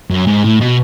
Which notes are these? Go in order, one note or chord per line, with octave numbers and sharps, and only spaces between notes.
F#2
G#2
A2
B2